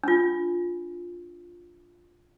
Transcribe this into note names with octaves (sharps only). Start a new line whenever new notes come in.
D4 F4